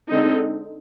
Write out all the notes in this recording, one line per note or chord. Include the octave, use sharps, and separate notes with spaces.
D3 G#3 C4 D#4